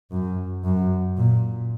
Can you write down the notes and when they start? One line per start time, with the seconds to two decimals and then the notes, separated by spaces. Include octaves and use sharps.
0.11 F#2
0.64 F#2
1.17 A#2